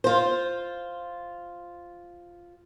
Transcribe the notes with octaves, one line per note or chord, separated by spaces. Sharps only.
F4 C5